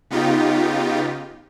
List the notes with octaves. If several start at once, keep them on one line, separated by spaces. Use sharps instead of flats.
C#3 B3 D#4 F4 G4